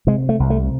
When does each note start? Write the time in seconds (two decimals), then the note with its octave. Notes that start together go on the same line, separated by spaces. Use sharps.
0.07 C3 G#3
0.29 A3
0.40 C2
0.50 A3